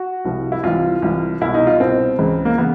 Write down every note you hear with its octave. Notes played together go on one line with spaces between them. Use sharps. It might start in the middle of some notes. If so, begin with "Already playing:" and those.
Already playing: F#4
C2 C3 F3
E4
C2 C3 E3 F4
C2 C3 E3
C2 B2 E4
D#4
F4
C2 B2 C4
C#2 C#3 E3
A#3
C#3 E3 B3